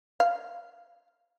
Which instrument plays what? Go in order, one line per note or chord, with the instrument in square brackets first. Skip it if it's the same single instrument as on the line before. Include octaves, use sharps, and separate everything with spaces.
[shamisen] F5